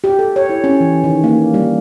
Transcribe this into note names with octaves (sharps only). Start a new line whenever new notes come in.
G4
A4
C#5
E4
C#4
E3
D#3
A#3
G3